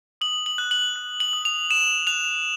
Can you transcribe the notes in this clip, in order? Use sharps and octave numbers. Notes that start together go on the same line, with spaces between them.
D#6 F#7
F#7
F#6
F#7
F#6
F#7
D#6
F7
D#6 E7
F#6 F7